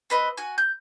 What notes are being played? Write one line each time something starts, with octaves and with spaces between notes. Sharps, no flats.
C4 B4 D#5
F#4 G#5
G6